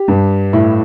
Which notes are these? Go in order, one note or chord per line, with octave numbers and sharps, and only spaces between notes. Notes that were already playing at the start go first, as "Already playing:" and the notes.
Already playing: G4
G2
A2 E4